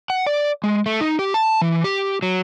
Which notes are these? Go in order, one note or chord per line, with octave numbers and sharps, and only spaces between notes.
F#5
D5
G#3
A3
D#4
G4
A5
E3
G4
F#3